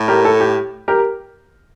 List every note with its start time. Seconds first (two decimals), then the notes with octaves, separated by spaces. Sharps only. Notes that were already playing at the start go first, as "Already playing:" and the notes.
Already playing: A2
0.08 G4 A#4
0.25 A4
0.40 G4
0.88 G4 A#4